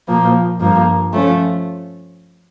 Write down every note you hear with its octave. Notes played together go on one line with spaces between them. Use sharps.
A#2 F3 A#3
G2 F3 A#3
F3 A3 C#4